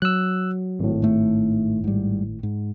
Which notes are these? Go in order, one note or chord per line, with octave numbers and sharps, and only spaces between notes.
F#3 E6 F#6
G#1 A2
G#2 A3
G#2 G3
G#2